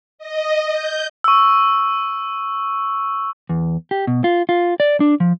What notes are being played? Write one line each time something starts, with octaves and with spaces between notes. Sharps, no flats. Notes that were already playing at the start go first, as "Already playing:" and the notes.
D#5
G6
C#6 E6
E2
G4
B2
F4
F4
D5
D4
F3